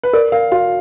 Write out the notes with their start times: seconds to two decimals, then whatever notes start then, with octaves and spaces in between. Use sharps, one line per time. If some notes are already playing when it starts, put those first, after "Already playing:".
0.03 B4
0.13 A#4 D5
0.32 A#4 F5
0.52 F#4 F5